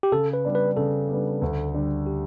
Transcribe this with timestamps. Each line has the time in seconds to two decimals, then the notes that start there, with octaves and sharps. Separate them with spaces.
0.03 G4
0.12 C#3 A4
0.33 B4
0.45 G3 B3 D4
0.55 B4
0.77 C#3 A4
1.09 G3 B3 D4
1.42 D2
1.74 D3 G3
2.06 G4